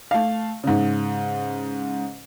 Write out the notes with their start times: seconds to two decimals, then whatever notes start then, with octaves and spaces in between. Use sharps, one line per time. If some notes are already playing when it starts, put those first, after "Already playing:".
0.11 A3 F5
0.64 G#2 C#3